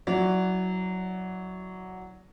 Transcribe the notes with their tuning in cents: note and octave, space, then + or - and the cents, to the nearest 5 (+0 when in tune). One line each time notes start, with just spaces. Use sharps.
F#3 +0 E4 -25 D5 -20